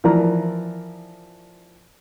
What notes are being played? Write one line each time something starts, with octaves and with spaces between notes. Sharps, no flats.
E3 F3 A#4 D5 A#5